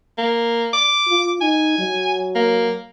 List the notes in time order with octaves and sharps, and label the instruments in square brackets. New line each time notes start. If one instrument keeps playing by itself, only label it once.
[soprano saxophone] A#3
D6
[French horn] F4
[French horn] D#4 [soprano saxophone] G#5
[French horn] F#3
[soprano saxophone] A#3